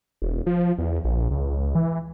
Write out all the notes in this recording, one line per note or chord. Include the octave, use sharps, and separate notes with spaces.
E1
F3
E2
A#1
C#2
E3